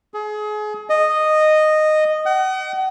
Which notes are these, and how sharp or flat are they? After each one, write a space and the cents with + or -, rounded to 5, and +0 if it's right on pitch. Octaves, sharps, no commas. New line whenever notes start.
G#4 +30
D#5 -10
F#5 +40